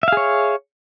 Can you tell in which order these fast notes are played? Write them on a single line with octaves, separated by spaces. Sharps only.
E5 F5 G#4 C#5